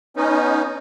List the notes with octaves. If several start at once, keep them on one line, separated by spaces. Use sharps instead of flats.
B3 C#4 D#4